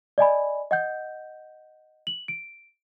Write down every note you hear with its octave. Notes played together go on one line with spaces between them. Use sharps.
D5 D#5 G#5 B5
D#5 F#5 G6
F#7
D7